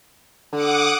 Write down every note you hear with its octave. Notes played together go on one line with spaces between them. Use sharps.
D3 F#5 D6 D#6